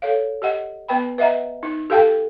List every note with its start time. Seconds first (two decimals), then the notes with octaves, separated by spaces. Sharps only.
0.02 A4 C#5 F5
0.42 G4 D#5 F#5
0.88 B3 B4 G5 B5
1.18 B4 D#5 E5 F#5 A#5
1.63 D#4
1.90 G4 A4 F5 G5 A5